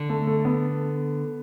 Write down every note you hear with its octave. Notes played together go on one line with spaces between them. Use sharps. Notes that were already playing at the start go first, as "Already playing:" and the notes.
Already playing: D3
A3
A3
B3